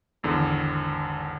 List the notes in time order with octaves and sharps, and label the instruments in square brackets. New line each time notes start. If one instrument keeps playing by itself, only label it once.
[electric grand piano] G#1 E2 D3